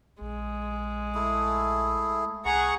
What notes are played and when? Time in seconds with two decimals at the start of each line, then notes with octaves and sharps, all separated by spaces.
0.21 A#1 G#3
1.15 A3 E4 G#4
2.45 C2 G#4 F#5 A#5 C#6